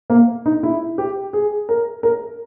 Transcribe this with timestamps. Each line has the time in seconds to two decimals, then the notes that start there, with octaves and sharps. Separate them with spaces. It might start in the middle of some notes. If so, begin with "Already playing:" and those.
0.10 A#3
0.46 D#4
0.63 E4
0.98 G4
1.33 G#4
1.69 A#4
2.03 A#4